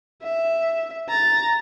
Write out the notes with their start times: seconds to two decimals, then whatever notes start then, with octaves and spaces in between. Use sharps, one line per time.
0.23 E5
1.09 A#5 A6